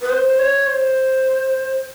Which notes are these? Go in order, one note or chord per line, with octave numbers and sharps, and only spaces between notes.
B4
C5
C#5
C5